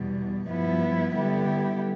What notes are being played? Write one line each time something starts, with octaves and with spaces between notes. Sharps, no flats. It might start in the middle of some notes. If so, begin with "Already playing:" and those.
Already playing: E2 B2 G3
G2 F3 B3 E4
D3 G3 B3 E4 G4